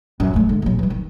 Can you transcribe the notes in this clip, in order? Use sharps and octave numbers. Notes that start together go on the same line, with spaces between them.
F#2
G#3 A3
D3
D#1 F#3
E3 G3
D#3